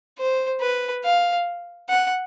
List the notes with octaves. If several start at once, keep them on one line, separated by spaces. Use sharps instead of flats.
C5
B4
F5
F#5